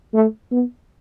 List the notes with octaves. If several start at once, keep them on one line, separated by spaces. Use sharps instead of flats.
A3
B3